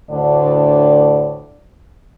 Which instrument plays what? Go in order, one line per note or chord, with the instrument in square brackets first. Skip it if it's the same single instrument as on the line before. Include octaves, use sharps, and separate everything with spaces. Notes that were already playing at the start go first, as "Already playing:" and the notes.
[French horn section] D2 A2 D3 D4 D5